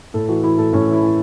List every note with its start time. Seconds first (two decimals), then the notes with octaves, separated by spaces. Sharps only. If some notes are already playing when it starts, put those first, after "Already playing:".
0.14 A2 A4
0.28 E3 F#4
0.43 E3 E4
0.58 A2 A4
0.73 A2 C#4
0.88 E3 E4
1.03 E3